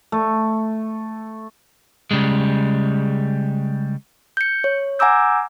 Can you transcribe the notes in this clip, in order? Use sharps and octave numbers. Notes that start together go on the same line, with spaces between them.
A3
C#3 G3 G#3
G6 C#7
C#5
F#5 G#5 A#5 D6 E6 G6